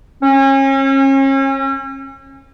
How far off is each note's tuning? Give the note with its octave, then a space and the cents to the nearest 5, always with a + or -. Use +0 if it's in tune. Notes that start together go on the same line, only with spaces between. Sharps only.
C#4 -35